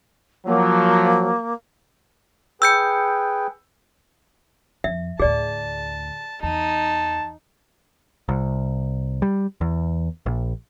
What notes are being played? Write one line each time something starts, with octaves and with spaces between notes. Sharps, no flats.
F3 F#3 A#3
G#4 B4 G5 E6 G6 C#7
F2 E5
D2 A2 G#4 D5 A5
E2 D#4 A5
C2
G3
E2
A#1